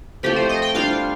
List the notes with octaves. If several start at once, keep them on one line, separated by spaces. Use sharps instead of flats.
F3 A3 C4 G4
C5
D#5
G5
G3 D4 F4 C5 F5